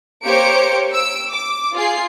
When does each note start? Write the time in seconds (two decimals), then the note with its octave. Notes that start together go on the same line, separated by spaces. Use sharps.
0.23 A#3 G4 C5 C#5 C#7 D7
0.92 E6 D7
1.32 D6
1.74 F4 G#4 C7